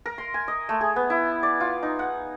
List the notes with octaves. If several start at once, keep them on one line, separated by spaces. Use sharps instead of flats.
A#4
C6
G#5
D#5
A3
G#4
B3
E4
D5
F4
D#4
F#5